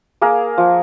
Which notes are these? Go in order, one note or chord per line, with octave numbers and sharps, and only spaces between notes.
A#3 G#4 A#4
F3